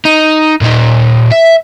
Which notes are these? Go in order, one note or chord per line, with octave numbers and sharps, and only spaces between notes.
D#4
A#2 D#4
E5